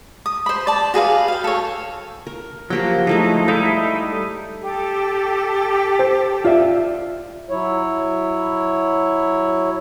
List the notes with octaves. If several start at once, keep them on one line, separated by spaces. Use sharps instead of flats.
D#6
C5 B5
D5 A5
F#4 G#4 B4 F5
F5 G5
A4 C#5
A#4
F3 F#3 A#3 F#4 G4 G5
G#3 A3 D#4 E4
G3 D#4 E4 A4 E5 F5
G4 A4
C5
F4 D5 E5
F#3 E4 C#5